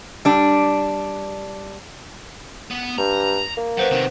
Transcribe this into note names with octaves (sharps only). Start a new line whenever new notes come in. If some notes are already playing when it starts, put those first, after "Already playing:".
G3 D4
B3
G2 A#5
A#3
F#2 B4 C5 F#5
C3 D#3